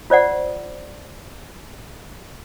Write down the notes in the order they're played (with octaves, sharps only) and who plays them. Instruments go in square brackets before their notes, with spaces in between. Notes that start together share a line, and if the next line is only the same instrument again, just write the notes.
[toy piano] F4 C5 D5 F#5